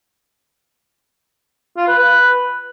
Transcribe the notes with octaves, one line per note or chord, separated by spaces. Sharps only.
F4
B4
B4